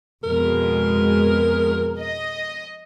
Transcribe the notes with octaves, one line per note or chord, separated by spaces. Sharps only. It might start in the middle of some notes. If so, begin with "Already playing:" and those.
F2 B2 G#3 A#4
D#5